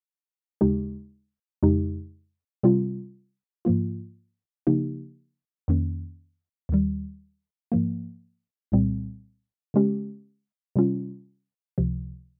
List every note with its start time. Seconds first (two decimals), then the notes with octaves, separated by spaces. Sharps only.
0.61 D#2 C#3 G#3 D#4 G4
1.63 F2 C#3 G#3 D#4 G4
2.63 C3 G3 C4 F4
3.65 G#2 F3 A#3 F4
4.67 C#3 F3 A#3 D#4 G4
5.68 F2 D#3 A#3 C#4
6.69 D#2 D#3 G3
7.72 G#2 F3 A#3
8.72 C2 A#2 G3 C4
9.74 C#3 G#3 C#4 G4
10.76 C3 G3 C#4 F4
11.78 C#2 C3 F3